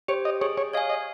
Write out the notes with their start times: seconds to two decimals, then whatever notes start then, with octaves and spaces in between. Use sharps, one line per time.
0.08 G4 C5 C#5
0.25 D#5
0.41 G#4 C#5
0.58 C#5
0.73 C#5 D#5 F5 G#5
0.90 D#5